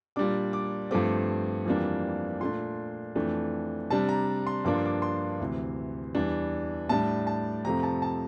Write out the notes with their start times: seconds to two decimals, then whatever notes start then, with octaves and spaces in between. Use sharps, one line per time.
0.16 A#2 G3 D4 D6
0.53 D6
0.91 G2 F3 A3 C4 D6
1.66 F2 E3 G3 A#3 D4
2.40 A#2 A3 D4 C6
3.15 F2 E3 A3 D4
3.90 C3 G3 D4 A5
4.09 A#5
4.47 C6
4.65 G2 F3 A#3 D4 D6
4.75 C6
4.85 D6
5.02 C6
5.40 D2 C3 E3
6.15 E2 E3 G3 D4
6.89 A2 G3 D4 A5
7.27 A5
7.65 F2 C3 F3 A3 A#5
7.83 A5
8.02 A5